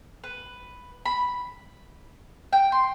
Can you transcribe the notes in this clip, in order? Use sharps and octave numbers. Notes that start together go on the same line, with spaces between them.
B4
B5
G5
C6